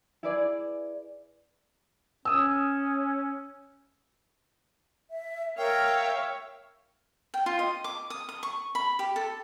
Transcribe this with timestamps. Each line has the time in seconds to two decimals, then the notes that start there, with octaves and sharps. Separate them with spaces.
0.23 E4 G#4 B4 D5 D6
2.25 C#4 D#6 E6
5.10 E5
5.58 A#4 C#5 E5 F5 G5
7.34 G5
7.46 F4
7.59 D#5
7.84 D6
8.10 D#6
8.29 D#6
8.43 C#6
8.75 B5
8.99 G4
9.16 A4